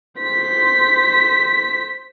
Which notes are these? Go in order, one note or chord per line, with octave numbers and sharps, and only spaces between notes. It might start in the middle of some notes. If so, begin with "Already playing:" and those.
C5 B6